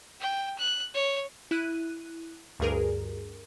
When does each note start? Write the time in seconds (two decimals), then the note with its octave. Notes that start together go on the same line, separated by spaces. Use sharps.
0.20 G5
0.58 F#6
0.94 C#5
1.51 E4 F#6 D#7
2.59 D2 G2 G#4 A#4